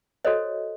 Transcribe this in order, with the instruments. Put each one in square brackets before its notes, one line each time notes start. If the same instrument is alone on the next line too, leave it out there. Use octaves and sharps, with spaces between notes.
[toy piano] F#4 A4 C5 C#5 D#5